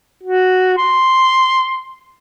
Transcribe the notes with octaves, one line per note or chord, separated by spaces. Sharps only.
F#4
C6